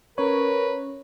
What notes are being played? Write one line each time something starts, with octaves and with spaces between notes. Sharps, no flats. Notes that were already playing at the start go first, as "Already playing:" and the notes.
C#4 A#4 B4 C#5